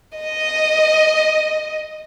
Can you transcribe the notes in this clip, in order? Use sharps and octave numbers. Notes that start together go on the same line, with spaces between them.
D#5